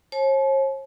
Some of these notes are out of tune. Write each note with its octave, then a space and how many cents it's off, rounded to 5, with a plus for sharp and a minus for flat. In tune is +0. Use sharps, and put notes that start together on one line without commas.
C#5 -45 A5 -45